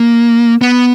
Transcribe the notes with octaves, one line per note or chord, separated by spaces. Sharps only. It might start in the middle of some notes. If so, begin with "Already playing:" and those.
Already playing: A#3
B3